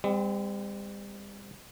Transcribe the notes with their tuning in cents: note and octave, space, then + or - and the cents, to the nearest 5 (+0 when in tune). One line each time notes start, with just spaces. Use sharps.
G3 +40 C4 -25